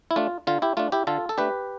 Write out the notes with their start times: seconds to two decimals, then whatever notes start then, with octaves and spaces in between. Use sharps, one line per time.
0.11 E4
0.16 A3 D4 F4
0.47 D3 F4
0.62 E4 G4
0.77 A3 D4 F4
0.92 E4 G4
1.07 D3 F4 A4
1.29 A4
1.38 A3 D4 G4 B4